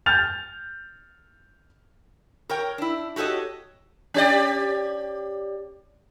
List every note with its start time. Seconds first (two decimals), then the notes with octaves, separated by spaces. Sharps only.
0.06 F6 G6 A6 F7
2.49 A#4 C#5 G5
2.78 D4 E4
3.16 F#4 G4 A4 C#5 D#5
4.14 C#4 G4 D5